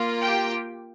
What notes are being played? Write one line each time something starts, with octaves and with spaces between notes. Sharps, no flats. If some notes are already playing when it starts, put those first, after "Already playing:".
Already playing: A#3 F4
G4 G5